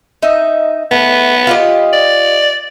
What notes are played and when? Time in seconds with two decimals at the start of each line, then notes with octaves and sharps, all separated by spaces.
0.23 D#4 E5
0.91 A3 B3
1.47 F4 G4 D#5
1.93 D5